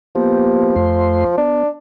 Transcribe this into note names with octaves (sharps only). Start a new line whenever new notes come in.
F3 A#3 B3 G4
F2 A3 C6
B3 D4